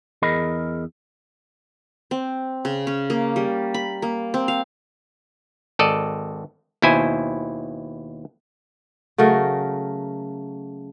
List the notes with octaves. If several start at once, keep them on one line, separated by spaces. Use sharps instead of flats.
E2 G#4 A#4 D#5 B5
C4
C#3
C#4
A#3
G3
B5
A#3
C4
F5
G#1 A4 D5 D#5
D#2 B2 E4 C5 G#5
C#3 F#3 A3 A#4